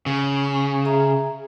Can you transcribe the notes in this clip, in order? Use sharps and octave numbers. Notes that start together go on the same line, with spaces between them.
C#3
G#4 E5 A#5